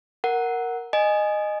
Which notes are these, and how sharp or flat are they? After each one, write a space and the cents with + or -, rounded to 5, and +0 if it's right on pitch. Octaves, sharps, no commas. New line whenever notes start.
A#4 +0 F#5 +0
D#5 -15 G#5 +0